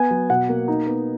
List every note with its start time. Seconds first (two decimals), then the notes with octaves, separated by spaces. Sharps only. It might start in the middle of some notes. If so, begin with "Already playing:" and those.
Already playing: B3 G#5
0.11 F#3
0.30 B2 F#5
0.49 A#3
0.68 D#4
0.87 B3